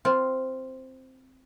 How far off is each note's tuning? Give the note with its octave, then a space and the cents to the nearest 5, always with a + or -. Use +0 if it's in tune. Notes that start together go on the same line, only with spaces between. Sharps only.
C4 +0 F4 +0